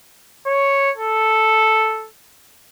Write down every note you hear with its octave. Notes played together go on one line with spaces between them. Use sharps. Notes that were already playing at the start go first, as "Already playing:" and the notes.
C#5
A4